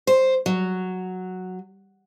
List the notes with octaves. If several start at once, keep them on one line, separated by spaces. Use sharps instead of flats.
C5
F#3